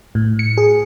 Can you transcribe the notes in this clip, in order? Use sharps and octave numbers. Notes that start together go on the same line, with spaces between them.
A2
C#7
G#4